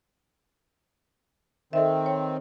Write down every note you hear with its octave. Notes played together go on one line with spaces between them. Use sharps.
D#3 C4 A4 D#5 E5
C#5